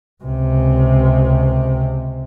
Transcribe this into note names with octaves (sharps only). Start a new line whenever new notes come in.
C#2 C3